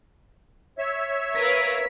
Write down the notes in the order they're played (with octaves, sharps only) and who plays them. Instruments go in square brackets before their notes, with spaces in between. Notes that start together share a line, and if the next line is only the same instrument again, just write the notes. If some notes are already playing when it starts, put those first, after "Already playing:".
[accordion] C#5 E5 E6
[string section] A#4 B4 F5 [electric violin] B6